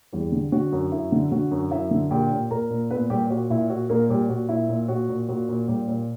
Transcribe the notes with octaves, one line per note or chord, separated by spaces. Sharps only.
E2 G3 G4
D3
D3 F#4
F#2
F#2 E4
D3
D3 F#4
F#2
F#2 E4 E5
D3
A#2 G4 G5
A#2
A#2 A#4 A#5
A#2
A#2 B3 B4
A#2 G3 G4
A#2 F#4
A#2 E4
A#2 F#4
A#2 A#3 A#4
A#2 G3 G4
A#2 F#4
A#2 E4
A#2
A#2 F#4
A#2
A#2 F#4
A#2
A#2 G3 G4
A#2